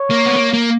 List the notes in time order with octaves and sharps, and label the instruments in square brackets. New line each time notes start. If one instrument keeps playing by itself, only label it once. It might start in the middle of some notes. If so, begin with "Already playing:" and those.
Already playing: [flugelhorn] C#5
[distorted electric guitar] A#3
B3
A#3
A#3